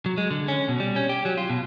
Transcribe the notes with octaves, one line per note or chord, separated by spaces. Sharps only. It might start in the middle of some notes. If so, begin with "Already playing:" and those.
F#3
G#3
D3
C#4
B2
G3
C#4
G4
F#3
F4
B2